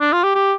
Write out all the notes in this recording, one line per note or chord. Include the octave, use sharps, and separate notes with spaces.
D4
F4
G4
G4